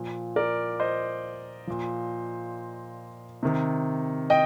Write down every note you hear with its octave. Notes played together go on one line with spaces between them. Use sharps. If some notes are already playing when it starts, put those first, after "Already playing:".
Already playing: A#2 F3
A#4 D5
C5 D#5
A#2 F3
C3 D#3
D#5 G5